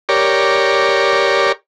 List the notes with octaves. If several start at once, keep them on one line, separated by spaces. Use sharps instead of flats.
G4 A#4 C#5 D5